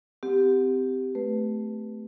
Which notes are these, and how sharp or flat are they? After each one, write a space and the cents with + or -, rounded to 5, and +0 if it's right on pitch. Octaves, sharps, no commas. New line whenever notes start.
C4 -30 G4 +0 F#5 -20
A3 +0 B4 +0